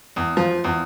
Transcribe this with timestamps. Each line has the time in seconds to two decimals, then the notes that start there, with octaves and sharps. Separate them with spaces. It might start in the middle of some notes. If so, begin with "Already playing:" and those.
0.16 E2
0.37 F3
0.64 E2